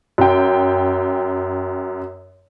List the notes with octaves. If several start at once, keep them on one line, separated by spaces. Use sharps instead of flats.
F#2 G5